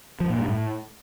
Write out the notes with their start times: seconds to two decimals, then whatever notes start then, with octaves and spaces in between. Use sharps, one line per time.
0.20 F3
0.30 A#2
0.39 G2
0.48 A2